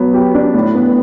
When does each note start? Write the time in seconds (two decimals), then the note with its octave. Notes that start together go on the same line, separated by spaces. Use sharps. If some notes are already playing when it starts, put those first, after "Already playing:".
Already playing: F#3 B3
0.14 G4
0.34 D4
0.54 A2
0.75 B3